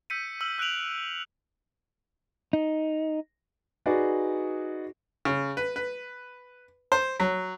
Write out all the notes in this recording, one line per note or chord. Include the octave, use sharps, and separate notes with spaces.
E6 G6 B6 C#7 D#7
E6 F6 F#7
E6 F#6 B6 D7 F7 F#7
D#4
D#4 F#4 G#4 B4 D5
C#3
B4
B4
C5
F#3